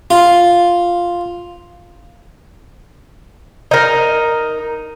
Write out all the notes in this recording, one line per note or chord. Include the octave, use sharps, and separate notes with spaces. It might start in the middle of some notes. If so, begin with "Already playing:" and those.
F4
D#4 A#4